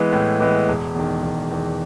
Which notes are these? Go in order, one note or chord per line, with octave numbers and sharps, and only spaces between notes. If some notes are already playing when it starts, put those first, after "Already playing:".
Already playing: E3 G#3 B3
A2
E3 G#3 B3
E1
E2 D#3
E1
E2 D#3